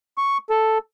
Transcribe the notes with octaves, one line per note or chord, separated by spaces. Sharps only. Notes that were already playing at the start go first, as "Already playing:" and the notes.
C#6
A4